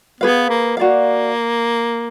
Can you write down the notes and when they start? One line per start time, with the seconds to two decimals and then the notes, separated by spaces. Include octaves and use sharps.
0.21 B3 G#4 B4 F5
0.49 A#3
0.77 A#3 F#4 D5 F5